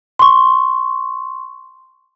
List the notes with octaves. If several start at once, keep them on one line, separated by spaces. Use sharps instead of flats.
C6 C#6